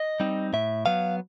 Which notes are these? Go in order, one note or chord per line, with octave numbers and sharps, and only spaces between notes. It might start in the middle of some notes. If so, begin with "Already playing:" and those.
Already playing: D#5
G3 C4 D#4
A2 E5
F#3 B3 F5